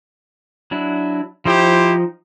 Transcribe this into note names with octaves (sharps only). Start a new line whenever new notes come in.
F#3 D4 E4
F3 D#4 E4 G4 C5 G5